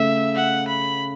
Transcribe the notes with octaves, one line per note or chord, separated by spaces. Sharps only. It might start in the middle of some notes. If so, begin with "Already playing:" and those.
Already playing: C#3 A3 E5
F#5
B5